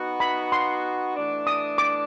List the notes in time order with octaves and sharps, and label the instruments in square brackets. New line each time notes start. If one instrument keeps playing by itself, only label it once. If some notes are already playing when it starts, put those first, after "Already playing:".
Already playing: [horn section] B3 D#4 F#4
[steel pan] B5
C6
[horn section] E3 A3 D4
[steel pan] D#6
D6